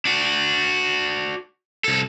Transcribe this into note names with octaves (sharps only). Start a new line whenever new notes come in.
D4 F#4
C2 A4